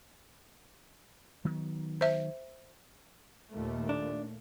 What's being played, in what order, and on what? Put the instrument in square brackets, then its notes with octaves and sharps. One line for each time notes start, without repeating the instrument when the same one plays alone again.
[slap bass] D#3 F#3 B3
[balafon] C5 E5
[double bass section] D#2 A#2 A3
[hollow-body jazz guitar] D4